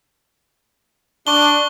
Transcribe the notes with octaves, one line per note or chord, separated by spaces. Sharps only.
D4 C#6 G7